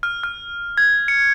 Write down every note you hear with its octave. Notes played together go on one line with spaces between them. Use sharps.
F6
F6
G#6
C#7